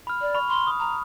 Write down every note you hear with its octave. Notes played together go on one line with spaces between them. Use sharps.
B5 F6
D5
B5 C#6 F6
C6
D#6
A#5